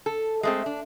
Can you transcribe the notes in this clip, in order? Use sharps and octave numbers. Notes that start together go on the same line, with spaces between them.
A4
G#3 A3 C4
D4